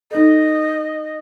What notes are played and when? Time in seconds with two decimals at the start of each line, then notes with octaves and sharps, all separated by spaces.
0.11 D#4 A4 D#5